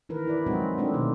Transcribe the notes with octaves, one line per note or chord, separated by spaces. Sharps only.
D#3 E3 A#4 B4
E4 D5
F3 F#3 G#3 C4 D#4 F#4
F3 A3 C4 D4
B2 D#3 A3